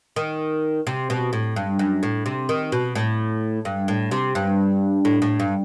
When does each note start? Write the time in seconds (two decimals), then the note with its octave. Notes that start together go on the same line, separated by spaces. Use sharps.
0.16 D#3
0.87 C3
1.10 B2
1.33 A2
1.56 G2
1.79 F#2
2.03 A2
2.26 C3
2.49 D#3
2.72 B2
2.95 A2
3.65 G2
3.88 A2
4.11 C3
4.35 G2
5.05 A2
5.22 A2
5.40 G2